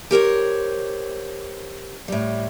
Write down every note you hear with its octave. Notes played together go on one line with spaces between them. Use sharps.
G4 A#4 C5 C#5
A2 G3